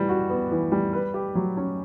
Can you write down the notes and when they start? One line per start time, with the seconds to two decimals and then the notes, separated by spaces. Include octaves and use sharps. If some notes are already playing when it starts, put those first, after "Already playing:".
Already playing: E3 G3
0.09 F#4
0.30 B3
0.51 E3
0.72 G3
0.93 B4
1.14 G4
1.35 F#3
1.57 C#4